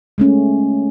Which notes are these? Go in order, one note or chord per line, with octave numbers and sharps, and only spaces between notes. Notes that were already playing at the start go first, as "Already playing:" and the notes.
G#3 A3 C#4